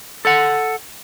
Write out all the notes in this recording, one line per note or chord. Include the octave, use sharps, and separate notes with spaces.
A4 F#5